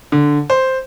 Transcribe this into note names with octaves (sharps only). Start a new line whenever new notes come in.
D3
C5